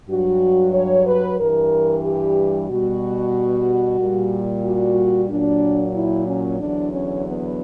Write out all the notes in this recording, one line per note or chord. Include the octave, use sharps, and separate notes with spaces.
G2 F#3 F#4
C#5
B4
G2 E3 G3 A#4
G4
B2 G3 F#4
A#2 G3
F#4
A#2 F#3 D4
E4
C#4
E2 D3 F#3 D4
C#4
B3